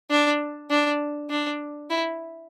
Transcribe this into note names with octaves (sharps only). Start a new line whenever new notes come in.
D4
D4
D4
E4